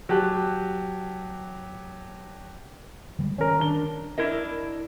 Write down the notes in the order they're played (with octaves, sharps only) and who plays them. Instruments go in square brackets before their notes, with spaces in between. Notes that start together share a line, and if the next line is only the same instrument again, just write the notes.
[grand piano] F#3 G4 A5 F#6
[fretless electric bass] D3 G3 G#3
[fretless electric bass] D#3 [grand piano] C#4 A#4
[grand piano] D4 G7
[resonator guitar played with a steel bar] D4 E4 A#4 D#5